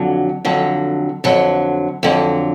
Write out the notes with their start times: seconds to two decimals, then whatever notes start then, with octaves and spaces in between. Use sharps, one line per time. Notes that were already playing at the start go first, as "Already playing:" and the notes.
Already playing: F2 D3 F#3
0.45 F2 D3 F#3
1.24 F2 D3 F#3
2.03 F2 D3 F#3